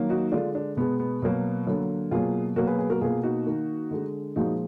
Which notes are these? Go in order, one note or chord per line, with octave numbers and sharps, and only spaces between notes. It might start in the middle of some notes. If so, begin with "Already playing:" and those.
Already playing: D#3 F#3 A#3
D#4 F#4
D3 G#3 D4 F4
D4
B2 G#3 B3
B3
B2 F#3 A#3
D3 F#3 A#3
B2 F#3 A#3 F4 G#4
B2 F#3 A#3 F#4 A#4
G#4 B4
G#4 B4
F#4 A#4
B2 A#3 F4 G#4
D#4 F#4
D#3 A#3
D3 G#3
A#2 F3 G#3 D#4 F#4